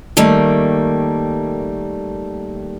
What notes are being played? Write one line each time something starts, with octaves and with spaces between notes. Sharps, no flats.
D#3 G3 A3 A#3